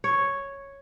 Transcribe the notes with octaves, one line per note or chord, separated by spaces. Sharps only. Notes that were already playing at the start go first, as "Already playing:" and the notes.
C#5